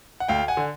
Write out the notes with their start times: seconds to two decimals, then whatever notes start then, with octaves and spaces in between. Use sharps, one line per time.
0.20 F#5
0.28 D2 F5 G5
0.48 F#5 G#5
0.57 D3